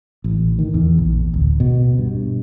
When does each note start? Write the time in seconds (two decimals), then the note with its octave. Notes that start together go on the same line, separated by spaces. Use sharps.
0.24 A1
0.59 D#3
0.74 E2
0.98 A#1
1.34 D1
1.60 B2
1.98 G2